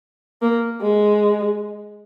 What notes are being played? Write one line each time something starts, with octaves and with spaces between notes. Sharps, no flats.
A#3
G#3